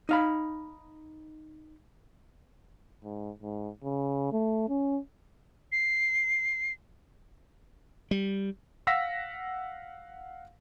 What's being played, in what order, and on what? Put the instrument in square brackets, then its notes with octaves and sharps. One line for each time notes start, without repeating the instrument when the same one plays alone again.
[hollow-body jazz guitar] D#4 F5 B5
[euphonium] G#2
G#2
C#3
A3
C#4
[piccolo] C7
[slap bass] G3
[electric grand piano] F5 F#5 E6 A#6 B6